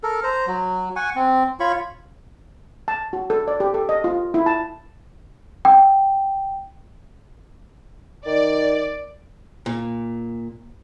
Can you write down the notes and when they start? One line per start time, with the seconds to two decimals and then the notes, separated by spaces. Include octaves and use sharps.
0.03 A4 A#4
0.23 C5 A#5
0.47 F#3
0.96 F#5 G#5 C#6
1.16 C4
1.60 F4 C#5 B5 C#6
2.88 A5
3.13 F#4
3.30 A4
3.48 D5
3.60 G4
3.74 A4
3.89 D#5
4.04 F4
4.34 E4
4.46 A5
5.65 G5
8.26 D#3 D5
9.66 A#2